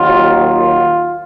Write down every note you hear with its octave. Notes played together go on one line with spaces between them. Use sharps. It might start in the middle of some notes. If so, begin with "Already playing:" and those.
Already playing: D#2 D#3 F#3 F4
F4